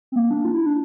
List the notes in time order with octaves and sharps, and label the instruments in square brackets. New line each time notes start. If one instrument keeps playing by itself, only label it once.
[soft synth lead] C4
A#3
D4
F4
E4
D4